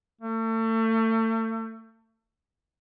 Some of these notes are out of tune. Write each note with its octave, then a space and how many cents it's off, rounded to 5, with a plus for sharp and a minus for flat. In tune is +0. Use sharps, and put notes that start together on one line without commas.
A3 +35